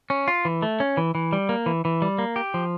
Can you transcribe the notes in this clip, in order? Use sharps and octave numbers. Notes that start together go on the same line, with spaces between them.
C#4
F4
E3
A3
C#4
E3
E3
G3
A#3
E3
E3
G3
A#3
G4
F3